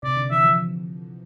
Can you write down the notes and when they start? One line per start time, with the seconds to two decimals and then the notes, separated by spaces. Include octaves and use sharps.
0.03 C3 D5
0.17 D3
0.31 E3 E5
0.44 F3